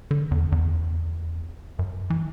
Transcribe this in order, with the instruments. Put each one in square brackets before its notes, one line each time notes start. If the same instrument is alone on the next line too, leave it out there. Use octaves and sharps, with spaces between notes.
[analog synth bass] D3
E2
E2
F#2
E3